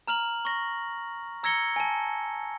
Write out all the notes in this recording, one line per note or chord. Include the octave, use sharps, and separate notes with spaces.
A#5 F6 F7 F#7
C#6 A#6
A#5 E6 G#6 A#6 C#7 G7
G#5 A5